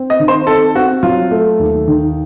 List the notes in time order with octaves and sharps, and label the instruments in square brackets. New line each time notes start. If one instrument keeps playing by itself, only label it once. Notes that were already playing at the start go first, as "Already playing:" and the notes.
Already playing: [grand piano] C4
[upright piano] D#5
[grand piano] D#3
[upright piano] C5
[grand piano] C4 [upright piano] A4
[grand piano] C4 [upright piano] F#4
[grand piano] F#3 [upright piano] F4
[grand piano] A3
D#2
D#3